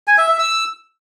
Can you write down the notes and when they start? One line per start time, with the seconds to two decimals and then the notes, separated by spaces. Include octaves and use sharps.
0.08 G#5
0.18 E5
0.28 E5
0.39 E6